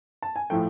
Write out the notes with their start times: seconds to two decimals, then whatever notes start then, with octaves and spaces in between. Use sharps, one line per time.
0.22 A5
0.36 G#5
0.50 A2 F3 A3 G5